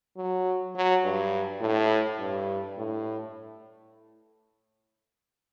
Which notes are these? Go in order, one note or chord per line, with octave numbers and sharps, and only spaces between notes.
F#3
F#3
G2
A2
G2
A2